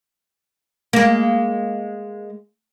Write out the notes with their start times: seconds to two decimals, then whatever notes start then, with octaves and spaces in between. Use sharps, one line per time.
0.93 G#3 A#3